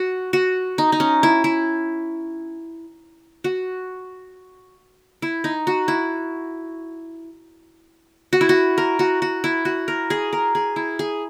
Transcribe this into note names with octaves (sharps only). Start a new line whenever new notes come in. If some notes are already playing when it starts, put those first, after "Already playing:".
Already playing: F#4
F#4
D#4
D#4
C#4
E4
E4
F#4
E4
D#4
F#4
E4
F#4
E4
F#4
A#4
F#4
F#4
E4
F#4
A#4
G#4
A#4
G#4
E4
G#4